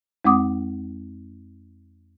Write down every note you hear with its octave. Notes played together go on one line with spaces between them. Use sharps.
F2 G#3 C4 F#5 D6 D#6